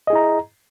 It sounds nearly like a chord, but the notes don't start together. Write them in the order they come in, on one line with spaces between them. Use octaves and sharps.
D#5 G#4 E4 A#5